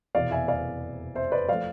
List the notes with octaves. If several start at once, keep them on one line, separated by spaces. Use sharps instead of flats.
F1 E2 B2 B3 D5 F5
E5 G#5
D5 F5
C5 E5
B4 D5
F3 A3 D5 F5